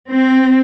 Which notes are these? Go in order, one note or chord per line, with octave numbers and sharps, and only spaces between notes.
C4